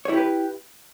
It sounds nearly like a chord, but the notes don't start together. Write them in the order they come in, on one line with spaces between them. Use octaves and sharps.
C#5 E4 G4 B4